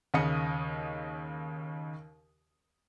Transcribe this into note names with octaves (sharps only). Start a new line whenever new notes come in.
D#2 C#3 D#5 D#6 C#7